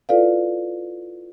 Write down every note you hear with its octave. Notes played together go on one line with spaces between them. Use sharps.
E4 F4 A4 B4 D5 F5